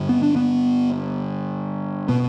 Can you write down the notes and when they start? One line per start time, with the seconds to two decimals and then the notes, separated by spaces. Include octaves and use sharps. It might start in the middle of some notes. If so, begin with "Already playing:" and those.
Already playing: G2 D3
0.09 B3
0.23 D4
0.36 B3
2.09 B2 B3